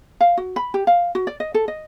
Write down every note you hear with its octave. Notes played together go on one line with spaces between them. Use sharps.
F5
F#4
B5
G4
F5
F#4
D5
D#5
A4
D#5